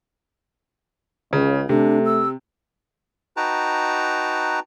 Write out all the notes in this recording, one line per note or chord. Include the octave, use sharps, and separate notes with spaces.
C#2 C#3
C3 A3 D4
E6
D#4 F#4 B4 G5 A5 A#5